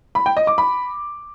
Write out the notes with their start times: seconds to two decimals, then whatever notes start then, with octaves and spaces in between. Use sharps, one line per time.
0.15 B5
0.26 G5
0.37 D#5
0.47 D6
0.58 B5